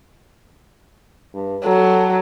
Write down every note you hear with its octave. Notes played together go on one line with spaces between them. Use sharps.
G2
F#3 A4